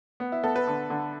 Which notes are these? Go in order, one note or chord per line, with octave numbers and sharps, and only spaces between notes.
B3
E4
B3 A4
B4
D3
D3